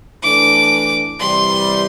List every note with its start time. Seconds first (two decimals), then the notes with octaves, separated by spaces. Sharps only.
0.23 E3 A3 D4 D6
1.20 C3 E3 G3 C6